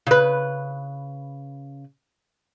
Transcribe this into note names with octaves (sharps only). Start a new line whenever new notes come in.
C#3 B4